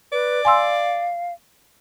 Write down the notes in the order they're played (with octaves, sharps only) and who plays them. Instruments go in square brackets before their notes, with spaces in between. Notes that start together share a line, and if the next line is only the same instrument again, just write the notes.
[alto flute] B4 [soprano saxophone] D5
[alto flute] F5 [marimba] G#5 C6 E6